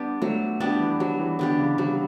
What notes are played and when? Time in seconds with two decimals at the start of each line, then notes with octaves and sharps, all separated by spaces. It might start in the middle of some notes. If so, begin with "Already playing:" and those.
Already playing: G3 B3 D4 G4
0.21 F#3 A3
0.60 G3 B3 D4 G4
0.80 E3
1.00 F#3 G3
1.19 E3
1.39 D3 B3 D4 G4
1.59 C#3
1.78 F#3 G3